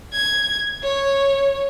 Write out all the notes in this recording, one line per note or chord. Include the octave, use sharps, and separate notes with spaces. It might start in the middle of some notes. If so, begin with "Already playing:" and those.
G#6
C#5